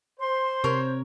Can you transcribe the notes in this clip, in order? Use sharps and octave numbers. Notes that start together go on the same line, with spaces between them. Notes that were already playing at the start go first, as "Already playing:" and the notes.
C5 C6
C3 A#4 C#5